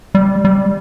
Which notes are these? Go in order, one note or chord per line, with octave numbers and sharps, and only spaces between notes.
G3
G3